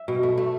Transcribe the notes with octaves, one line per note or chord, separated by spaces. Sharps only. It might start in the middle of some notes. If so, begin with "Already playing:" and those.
Already playing: E5
B2
A3
A3